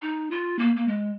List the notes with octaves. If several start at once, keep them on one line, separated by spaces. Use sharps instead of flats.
D#4
F4
A#3
A#3
G#3